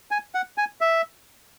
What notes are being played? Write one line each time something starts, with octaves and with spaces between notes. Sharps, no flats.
G#5
F#5
G#5
E5